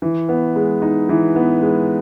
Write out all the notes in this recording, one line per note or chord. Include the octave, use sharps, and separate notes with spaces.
E3
B3
G#3
D#4
E3
B3
G#3